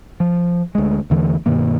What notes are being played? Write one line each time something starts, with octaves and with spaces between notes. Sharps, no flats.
F3
D2 G#3
E2 D3 E3 A3
G2 B2 D#3 A#3